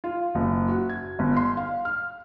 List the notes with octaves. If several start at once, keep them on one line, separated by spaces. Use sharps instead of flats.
F4
F#1
F#4
G#6
G1
C6
F5
F6